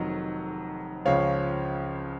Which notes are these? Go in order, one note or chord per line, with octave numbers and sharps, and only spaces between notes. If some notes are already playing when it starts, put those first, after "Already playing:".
Already playing: F1 F2 D#3 F#3 D#5
C#2 C#3 F3 C#5 F5